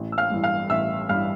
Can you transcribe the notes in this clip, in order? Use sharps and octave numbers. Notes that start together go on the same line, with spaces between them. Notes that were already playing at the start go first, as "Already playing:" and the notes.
Already playing: A1
E6
F5 F6
G2 E3
F5 F6
A1 E5 E6
G2 E3 F5 F6